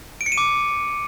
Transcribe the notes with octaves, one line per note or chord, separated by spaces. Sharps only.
D7
C#7
D#7
D6